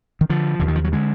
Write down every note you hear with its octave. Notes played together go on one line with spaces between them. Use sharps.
D#3
D3 F3
D#2 D3
D#3
F3
F#3
D3 G#3